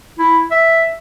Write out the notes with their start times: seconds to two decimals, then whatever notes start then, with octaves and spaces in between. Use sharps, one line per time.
0.19 E4
0.51 E5